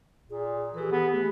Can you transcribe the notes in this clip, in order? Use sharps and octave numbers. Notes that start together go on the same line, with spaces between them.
A#2 G#4
E3 G4 A4
B3
A3 B3